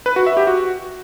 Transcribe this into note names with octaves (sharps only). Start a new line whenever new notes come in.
B4
F#4
E5
G4
F#4